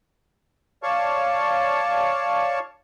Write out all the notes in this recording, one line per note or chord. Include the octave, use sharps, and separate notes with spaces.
C#5 D5 F5 A5 C#6